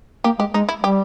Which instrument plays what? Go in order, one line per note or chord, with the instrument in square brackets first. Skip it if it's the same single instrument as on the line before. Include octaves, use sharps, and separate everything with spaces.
[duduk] A#3 [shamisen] G4
[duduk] G#3 [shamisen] G4
[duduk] G#3 [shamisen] D#4
[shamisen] E4
[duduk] G3 [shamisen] G4